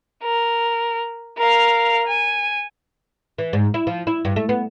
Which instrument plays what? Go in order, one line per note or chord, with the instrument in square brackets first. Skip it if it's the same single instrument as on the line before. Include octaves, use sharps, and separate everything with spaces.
[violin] A#4
A#4 F5
G#5
[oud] E3
G#2
E4
F3
E4
G2
A3
B3